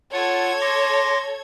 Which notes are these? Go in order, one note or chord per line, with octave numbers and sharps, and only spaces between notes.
F4 A4 C#5 F#5 G#6
C6 D6 A#6